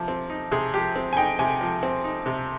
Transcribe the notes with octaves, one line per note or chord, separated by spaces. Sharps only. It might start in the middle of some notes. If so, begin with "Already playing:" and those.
Already playing: C3 F3
C4
D#4
C3 G#4
F3 G4
C4
G#5
D#4 G5
C3 G#5
F3
C4
D#4
C3